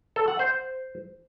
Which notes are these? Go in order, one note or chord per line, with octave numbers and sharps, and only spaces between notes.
A4
F#5
C5